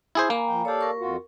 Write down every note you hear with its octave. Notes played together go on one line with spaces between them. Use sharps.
E4 G#4 C5
A#3 G#5 A#5 B5
F3 G5
G4 A4 C#5 D5 F5
A#4 C#6
F2 F4 F#4